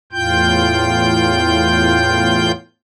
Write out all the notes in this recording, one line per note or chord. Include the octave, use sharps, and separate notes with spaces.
E2 A2 F4 G5 G6